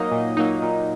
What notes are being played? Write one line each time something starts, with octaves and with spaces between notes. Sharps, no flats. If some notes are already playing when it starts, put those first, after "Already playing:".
Already playing: F#3 A#3 D#4 D#5
A#2
F#3 A#3 D#4
A#2